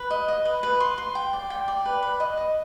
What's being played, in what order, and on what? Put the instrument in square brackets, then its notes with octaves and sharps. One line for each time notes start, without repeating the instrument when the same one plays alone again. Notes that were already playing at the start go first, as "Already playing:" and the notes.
Already playing: [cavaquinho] B4
D#5
D#5
B4
B4
C6
C6
G5
D5
G5
D5
B4
B4
D#5
D#5